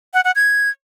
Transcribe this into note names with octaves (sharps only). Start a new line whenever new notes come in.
F#5
F#5
G#6